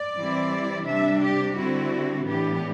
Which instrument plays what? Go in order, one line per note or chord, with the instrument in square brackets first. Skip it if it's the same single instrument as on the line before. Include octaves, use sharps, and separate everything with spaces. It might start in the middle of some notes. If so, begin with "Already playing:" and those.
Already playing: [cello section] D5
E3 G3 C4 E4
C3 G3 D4 E5
G4
D3 G3 C4 E4 F#4
A2 E3 B3 D4 G4